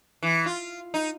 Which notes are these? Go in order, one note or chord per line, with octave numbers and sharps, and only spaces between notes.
E3
F4
D#4